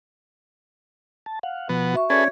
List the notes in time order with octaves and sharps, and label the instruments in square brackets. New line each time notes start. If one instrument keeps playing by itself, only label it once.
[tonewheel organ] A5
F5 F#5
[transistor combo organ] B2 B3 [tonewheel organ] F3 F#5
[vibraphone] F#4 E5 C#6
[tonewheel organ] C#4 D5 [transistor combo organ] G#4 A4 B4 [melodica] C#5